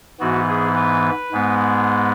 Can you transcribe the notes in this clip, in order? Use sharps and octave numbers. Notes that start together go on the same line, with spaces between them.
G#2 E3 B3 F#4
G#4
B4
G#2 G#3 B3